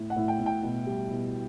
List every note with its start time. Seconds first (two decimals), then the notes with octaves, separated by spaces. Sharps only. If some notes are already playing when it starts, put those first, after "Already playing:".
Already playing: A2
0.10 F#5
0.16 A2
0.28 G5
0.40 A2
0.46 G5
0.63 B2
0.87 G3
1.10 B2